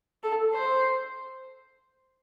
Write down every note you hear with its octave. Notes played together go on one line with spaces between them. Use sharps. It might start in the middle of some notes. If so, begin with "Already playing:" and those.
A4
C5